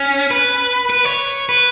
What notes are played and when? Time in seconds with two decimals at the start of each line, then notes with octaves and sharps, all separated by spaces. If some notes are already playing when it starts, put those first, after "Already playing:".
Already playing: C#4
0.31 B4
0.90 B4
1.05 C#5
1.49 B4